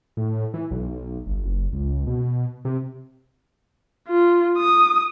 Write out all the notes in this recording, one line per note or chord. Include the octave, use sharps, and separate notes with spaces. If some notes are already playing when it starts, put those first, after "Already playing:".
A2
E3
B1
G1
F#1
C#2
B2
C3
F4
D#6